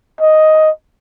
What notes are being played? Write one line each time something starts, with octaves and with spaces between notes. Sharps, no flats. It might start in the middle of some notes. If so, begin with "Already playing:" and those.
D#5